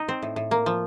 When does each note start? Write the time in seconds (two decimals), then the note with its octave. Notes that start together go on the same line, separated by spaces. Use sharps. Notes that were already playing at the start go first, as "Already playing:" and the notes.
Already playing: D#4
0.09 C4
0.22 A2
0.36 A2
0.51 A#3
0.66 F3